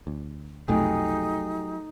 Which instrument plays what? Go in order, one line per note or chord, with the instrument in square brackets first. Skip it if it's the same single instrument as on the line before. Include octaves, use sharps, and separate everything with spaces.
[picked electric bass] D2
[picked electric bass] F1 B1 F2 [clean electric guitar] F#3 G4 G#4 [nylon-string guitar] A3 [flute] D#4